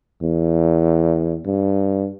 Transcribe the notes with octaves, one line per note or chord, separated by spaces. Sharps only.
E2
G2